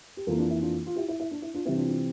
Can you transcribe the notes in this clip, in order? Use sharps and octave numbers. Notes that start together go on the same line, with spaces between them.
G4
F2 E3 A#3 F4 A4
D4 F4
E4
D4 F4
F4
E4 G4
E4
E4
D4
E4
D4 F4
C3 E3 G3 C4 E4
D4 F4
D4 F4